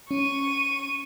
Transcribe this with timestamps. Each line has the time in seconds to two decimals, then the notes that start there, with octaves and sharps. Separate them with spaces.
0.11 C#4 C#6 D#7